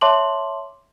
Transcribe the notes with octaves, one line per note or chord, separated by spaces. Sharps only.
C#5 E5 A5 C6 D6 F#7